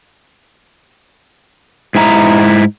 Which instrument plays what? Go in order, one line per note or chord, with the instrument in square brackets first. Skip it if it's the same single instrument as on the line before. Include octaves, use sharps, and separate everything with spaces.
[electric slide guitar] G#2 E4 G#5 A#5